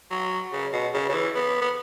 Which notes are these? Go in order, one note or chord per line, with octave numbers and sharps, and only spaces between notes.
F#3
C#3
B2
C#3
C#3
E3
B3
B3